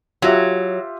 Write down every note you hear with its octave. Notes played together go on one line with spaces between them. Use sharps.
F#3 F4 G4 E5